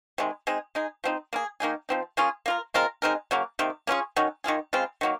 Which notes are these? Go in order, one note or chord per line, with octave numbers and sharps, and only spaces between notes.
C3 D#3 G#3
G#3 C4 D#4 G#4
G#3 D#4 G#4
F3 C4 D#4
A#3 F4 G#4
D#3 A#3 D#4 G#4
F3 C4 D#4
A#3 C#4 F4 G#4
A#3 F4 A#4
G#3 C4 F4 A#4
G#3 C4 D#4 A#4
C#3 F#3 A#3
C3 D#3 A#3
A#3 C#4 F4 G#4
D#3 F#3 C#4
D#3 A#3 F4 G#4
C#3 G#3 C4 F4
D#3 F#3 A#3